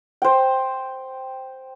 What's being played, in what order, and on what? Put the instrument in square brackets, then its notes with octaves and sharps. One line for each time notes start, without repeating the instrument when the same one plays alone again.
[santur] C5 G5